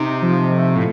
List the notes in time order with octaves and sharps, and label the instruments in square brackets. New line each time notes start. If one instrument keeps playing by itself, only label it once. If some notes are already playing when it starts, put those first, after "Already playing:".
Already playing: [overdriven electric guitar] C3 [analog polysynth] D#4
[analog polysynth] F3
A3
[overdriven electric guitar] A2